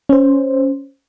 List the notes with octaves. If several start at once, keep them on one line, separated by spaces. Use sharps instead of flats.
C#4 C5